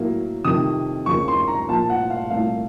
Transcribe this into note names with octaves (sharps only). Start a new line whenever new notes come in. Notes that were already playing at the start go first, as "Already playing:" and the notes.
Already playing: A2 F#3 A#3
F2 C3 D#3 D#6
D#2 C#3 F3 C#6
C6
A#5
A#2 F3 A#3 A5
F#5
F5
C2 A#2 A3 F5